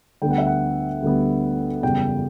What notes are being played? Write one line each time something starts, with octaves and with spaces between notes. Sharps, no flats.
D2 D3 G3 B3 G5
F#5
E5
F#5
D2 D3 G3 B3
F#1 E2 C#3 G3 G5